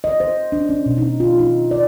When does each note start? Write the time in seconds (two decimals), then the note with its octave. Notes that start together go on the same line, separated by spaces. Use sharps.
0.04 D#5
0.20 C5
0.52 D4
0.69 C#4
0.86 B2
0.98 D#4
1.20 F4
1.39 D#4
1.71 D5